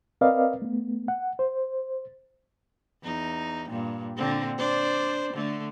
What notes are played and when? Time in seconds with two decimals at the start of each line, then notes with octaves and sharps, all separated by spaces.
0.21 C4 A#4 B4 D5 D#5 F5
0.62 A3 B3
1.08 F#5
1.39 C5
3.03 E2 D#4
3.69 G2 A#2
4.17 A#2 D3 C4
4.58 D4 C5 D5
5.33 D3 A3